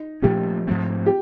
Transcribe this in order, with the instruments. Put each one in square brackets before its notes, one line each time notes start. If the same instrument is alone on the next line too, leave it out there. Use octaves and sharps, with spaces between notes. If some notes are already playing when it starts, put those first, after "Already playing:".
Already playing: [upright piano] D#4
[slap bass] A#2 F3 A3 C#4 [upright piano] G4
[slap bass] G#2 F3 A3 C4
[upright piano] G4